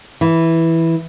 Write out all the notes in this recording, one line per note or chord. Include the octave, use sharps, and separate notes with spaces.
E3